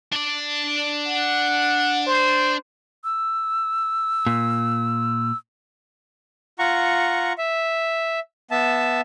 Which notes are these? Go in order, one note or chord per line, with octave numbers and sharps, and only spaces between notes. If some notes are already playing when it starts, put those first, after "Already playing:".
D4 D5
F#5
C5
E6
A#2
F4 F#5 A#5 C#6
E5
B3 E5 A5